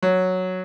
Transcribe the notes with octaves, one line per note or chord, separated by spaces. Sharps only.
F#3